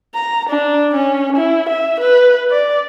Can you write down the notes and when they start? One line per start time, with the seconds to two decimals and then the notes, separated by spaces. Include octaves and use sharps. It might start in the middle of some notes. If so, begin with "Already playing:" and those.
0.15 A#5
0.50 D4
0.95 C#4
1.36 E4
1.69 E5
2.00 B4
2.51 D5